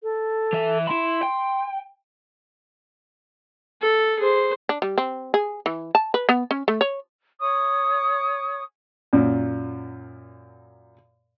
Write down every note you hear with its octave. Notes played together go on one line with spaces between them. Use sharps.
A4
E3 E5
E4 B5 C6
G5
A4
G#4 C5
D4
G3
C4
G#4
E3
A5
B4
B3
C#4
A3
C#5
C#5 C#6 D#6
F#2 A#2